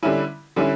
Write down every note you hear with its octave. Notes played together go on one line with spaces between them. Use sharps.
D3 G3 C#4 E4
D3 G3 C#4 E4